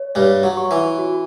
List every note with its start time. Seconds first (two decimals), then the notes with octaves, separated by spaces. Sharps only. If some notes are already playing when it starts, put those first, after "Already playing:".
Already playing: C#5
0.15 G2 G3 C#5
0.43 F#3
0.57 C#6
0.71 E3
0.98 F#4